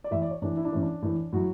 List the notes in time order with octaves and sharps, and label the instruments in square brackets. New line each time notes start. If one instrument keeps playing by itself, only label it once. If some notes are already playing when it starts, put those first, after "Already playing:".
[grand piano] D5
A2 E3 E5
D5
C#5
A2 E3 D4
E4
D4
A2 E3 C#4
D4
A2 E3
A2 F#3 F#4